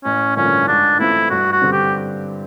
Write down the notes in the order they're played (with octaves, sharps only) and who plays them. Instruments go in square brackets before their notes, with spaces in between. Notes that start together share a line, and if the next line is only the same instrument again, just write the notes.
[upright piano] A1 [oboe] C#4
[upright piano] G2 D3 F3 A#3 [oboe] C#4
[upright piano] G#2 [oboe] D4
[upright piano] E3 A3 C4 F4 [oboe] E4
[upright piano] G2 [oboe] F#4
[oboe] F#4
[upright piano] D3 G3 C4
[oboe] G4